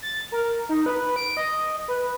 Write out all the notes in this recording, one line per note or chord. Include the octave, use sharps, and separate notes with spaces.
A6
A#4
D#4
B4
D7
D#5
B4